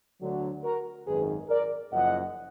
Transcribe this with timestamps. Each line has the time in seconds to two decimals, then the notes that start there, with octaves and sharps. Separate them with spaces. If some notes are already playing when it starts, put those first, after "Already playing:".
0.21 D2 D3 F#3
0.64 F#4 A#4
1.06 G#1 F#2 D#3 G#4 B4
1.49 A#4 D5
1.92 F#1 F#2 F3 D#5 F#5